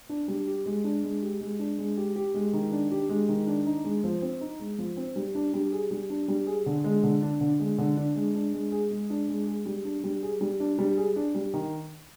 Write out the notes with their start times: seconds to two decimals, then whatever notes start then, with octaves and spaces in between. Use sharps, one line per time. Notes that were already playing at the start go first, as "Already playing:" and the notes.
0.09 D4
0.28 G3
0.47 G4
0.66 G#3
0.84 D4
1.04 G#3
1.22 G4
1.41 G#3
1.59 D4
1.78 G#3
1.97 G4
2.16 G4
2.34 G#3
2.53 D#3
2.71 D4
2.91 G4
3.09 G#3
3.29 D#3
3.47 D4
3.66 D#4
3.85 G#3
4.04 F3
4.22 C4
4.41 D#4
4.60 G#3
4.78 F3
4.97 C4
5.16 G3
5.35 D4
5.54 G3
5.72 G#4
5.91 G3
6.10 D4
6.28 G3
6.47 G#4
6.66 D3
6.84 G#3
7.03 D3
7.22 D4
7.41 D3
7.60 G#3
7.78 D3
7.97 D4
8.16 G#3
8.35 D4
8.53 G#3
8.72 G#4
8.91 G#3
9.10 D4
9.28 G#3
9.47 G#4
9.66 G3
9.85 D4
10.04 G3
10.23 G#4
10.41 G3
10.60 D4
10.79 G3
10.97 G#4
11.16 D4
11.35 G3
11.54 D#3